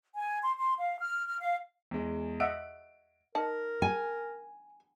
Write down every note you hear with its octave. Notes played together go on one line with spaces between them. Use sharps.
G#5
C6
C6
F5
F6
F6
F5
E2 G#3
D#5 E5 F#5 D7
D#4 A#4 A5
G#5